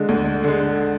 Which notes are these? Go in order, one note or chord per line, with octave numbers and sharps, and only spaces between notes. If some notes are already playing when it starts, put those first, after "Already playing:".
Already playing: D3 G#3
D2
D3 G#3